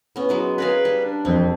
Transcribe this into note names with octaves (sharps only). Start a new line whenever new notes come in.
B3 C#4
F#3 G#3 B4
G#4 A#4 B4 F5
G3
D4
E1 F2 C4